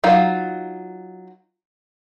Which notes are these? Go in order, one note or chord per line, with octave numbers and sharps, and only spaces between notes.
F#3 D#4 F4 F5